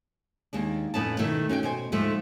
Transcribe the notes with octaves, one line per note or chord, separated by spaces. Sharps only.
D#2 G#3 D4
F2 A2 B3 C#4 A5
B2 D#3 A3 E4
C#4 F#4 F#5 G5
B2 C5 G#5
D2 G#2 F3 A3 E5